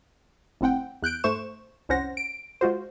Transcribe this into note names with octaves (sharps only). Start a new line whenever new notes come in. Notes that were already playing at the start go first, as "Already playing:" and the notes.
G1 A2 C4 F#5 G5
E2 F#6 G6 D7
G#2 A3 C5 C#6 E7
C2 F2 C#4 C5 F#5 A#6
D7
G#3 F4 F#4 C5